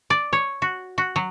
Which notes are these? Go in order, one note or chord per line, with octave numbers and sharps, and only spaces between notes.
D5
C#5
F#4
F#4
F#3